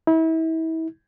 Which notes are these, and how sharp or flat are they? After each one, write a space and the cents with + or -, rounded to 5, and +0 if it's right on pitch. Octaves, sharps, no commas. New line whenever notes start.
E4 -35